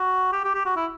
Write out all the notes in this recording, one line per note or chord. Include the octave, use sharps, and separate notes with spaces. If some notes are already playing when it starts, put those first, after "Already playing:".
Already playing: F#4
G4
G4
G4
F#4
E4